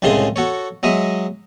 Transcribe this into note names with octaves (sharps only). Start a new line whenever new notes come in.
C2 A2 C#3 G#3 G#4 C6
F#4 A4 C#5
F#3 G#3 D#5 E5